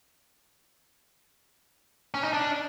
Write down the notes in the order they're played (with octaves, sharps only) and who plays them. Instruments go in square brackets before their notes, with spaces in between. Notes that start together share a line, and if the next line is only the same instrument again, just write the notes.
[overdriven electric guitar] C#4
D#4
D4